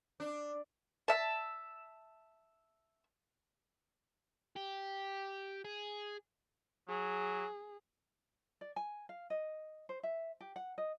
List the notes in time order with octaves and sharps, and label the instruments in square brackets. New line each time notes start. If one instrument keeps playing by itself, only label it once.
[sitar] D4
[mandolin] E5 A5
[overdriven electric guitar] G4
G#4
[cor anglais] F#3 [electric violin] G#4
[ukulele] D5
G#5
F5
D#5
C5
E5
G4
F#5
D#5